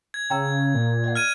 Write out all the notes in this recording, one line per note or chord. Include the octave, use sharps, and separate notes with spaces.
G#6
C#3 G5 A#5 E6
A#2
D5 D#5 F#5
F6 G#6 D#7